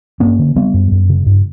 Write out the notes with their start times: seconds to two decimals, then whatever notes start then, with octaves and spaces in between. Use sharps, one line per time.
0.20 G2 A#3 C#4
0.39 D3
0.56 C#3 G3 B3
0.74 F#2
0.92 F#2
1.09 C#3
1.26 G2